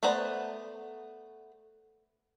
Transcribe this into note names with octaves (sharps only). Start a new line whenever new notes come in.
A3 B3 C5 D5 A#5